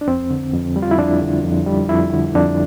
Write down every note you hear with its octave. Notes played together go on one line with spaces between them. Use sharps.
D4
F2 C4
D3
F2
G3
F4
E4
F2 D4
D3
F2
G3
F2 E4
D3
F2 D4